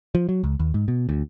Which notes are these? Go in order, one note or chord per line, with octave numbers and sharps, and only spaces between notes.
F3
F#3
C#2
D#2
G#2
B2
D2